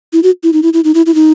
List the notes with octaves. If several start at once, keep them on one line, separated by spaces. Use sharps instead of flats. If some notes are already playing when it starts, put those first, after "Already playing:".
E4
F#4
E4
D#4
E4
E4
D#4
E4
E4
D#4